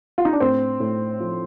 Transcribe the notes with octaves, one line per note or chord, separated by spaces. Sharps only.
F4
D#4
D4
A2 C4
A2
F3